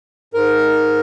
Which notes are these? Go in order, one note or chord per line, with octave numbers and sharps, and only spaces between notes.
G#2 A#4